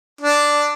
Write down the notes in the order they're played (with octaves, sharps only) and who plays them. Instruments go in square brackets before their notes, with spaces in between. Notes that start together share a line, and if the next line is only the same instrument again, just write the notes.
[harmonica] D4